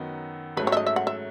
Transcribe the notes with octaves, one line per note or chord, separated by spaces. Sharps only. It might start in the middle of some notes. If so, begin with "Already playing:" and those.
Already playing: F#2 D#3 F#3 B3 D#4
G#2 F#3 A3 C#4 B4
C#5
E5
D#5
E5
F#5
E5